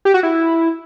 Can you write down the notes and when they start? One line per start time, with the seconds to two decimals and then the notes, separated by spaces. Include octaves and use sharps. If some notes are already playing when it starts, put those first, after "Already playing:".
0.05 G4
0.14 F#4
0.23 E4